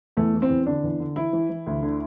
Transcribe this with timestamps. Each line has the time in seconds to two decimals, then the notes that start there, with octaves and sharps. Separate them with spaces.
0.17 E2 A3
0.34 E3
0.42 C4
0.50 E2
0.66 D3 D4
0.83 E2
1.00 D3
1.16 E3 E4
1.33 E3
1.50 E3
1.66 D2
1.83 D3